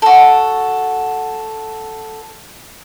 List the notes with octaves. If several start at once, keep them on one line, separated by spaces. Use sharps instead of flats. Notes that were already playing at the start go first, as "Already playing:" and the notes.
F#4 A4